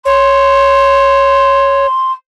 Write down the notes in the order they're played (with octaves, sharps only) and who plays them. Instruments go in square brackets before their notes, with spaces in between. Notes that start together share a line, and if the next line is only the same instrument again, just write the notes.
[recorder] C#5 [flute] C6